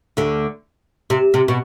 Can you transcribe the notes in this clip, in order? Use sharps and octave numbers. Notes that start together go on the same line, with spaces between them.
D2 D3
C3
C3
B2